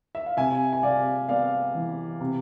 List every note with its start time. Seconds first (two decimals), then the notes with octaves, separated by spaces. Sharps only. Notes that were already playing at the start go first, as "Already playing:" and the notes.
0.15 E5
0.26 F5
0.37 C3 E5 G#5
0.73 G#5
0.83 C3 D5 F5
1.29 B3 D5 F5
1.75 E3
2.20 C3